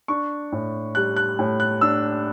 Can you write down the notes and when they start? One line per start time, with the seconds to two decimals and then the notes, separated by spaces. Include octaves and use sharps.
0.08 D4 C#6
0.52 A2
0.95 G3 F#6
1.17 F#6
1.39 A2
1.60 F#6
1.81 D4 E6